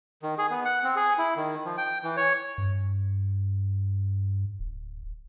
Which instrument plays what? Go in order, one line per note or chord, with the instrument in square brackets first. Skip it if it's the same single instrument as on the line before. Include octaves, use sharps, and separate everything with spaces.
[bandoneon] D#3
G#4
B3
F#5
C4
G#4
E4
D#3
F3
G5
E3
C#5
[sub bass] G2
D1